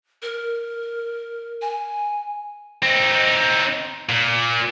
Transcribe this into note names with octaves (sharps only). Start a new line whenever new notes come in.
A#4
G#5
C4 D#4
A#2